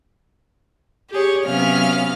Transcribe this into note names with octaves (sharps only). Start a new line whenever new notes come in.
G4 G#4 C#5
C3 F#3 B3 C#4 F5 F6